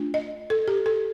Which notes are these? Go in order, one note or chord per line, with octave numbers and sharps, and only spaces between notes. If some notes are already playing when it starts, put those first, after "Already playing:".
Already playing: A3 D4 F4
D#5
A4
G4
A4